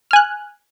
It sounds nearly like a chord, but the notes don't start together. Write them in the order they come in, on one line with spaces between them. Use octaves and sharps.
F6 G#5 F#6